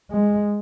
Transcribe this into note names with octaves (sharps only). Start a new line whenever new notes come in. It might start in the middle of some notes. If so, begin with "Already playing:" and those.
G#3